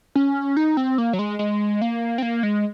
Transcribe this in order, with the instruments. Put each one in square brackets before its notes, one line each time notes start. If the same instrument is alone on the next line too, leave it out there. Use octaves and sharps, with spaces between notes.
[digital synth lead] C#4
D#4
C4
A#3
F#3
G#3
G#3
A#3
C4
A#3
G#3